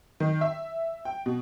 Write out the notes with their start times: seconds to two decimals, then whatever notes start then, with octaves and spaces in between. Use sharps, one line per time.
0.20 D#3
0.41 E5
1.05 G5
1.26 B2